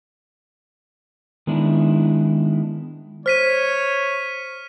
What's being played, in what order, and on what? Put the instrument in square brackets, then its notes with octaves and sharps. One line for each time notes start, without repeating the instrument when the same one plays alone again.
[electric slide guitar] D#3 G#3 B3 D4 E4
[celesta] C5 [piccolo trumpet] C#5 [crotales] F6 B6 D#7